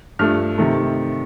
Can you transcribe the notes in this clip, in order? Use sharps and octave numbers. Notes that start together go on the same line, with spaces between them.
G2 F3 A3 F6
C3 D#3 A3